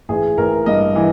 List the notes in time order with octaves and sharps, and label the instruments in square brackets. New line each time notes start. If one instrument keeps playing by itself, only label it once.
[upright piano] A1 G#4
A1 A#4
G2 D#5
E3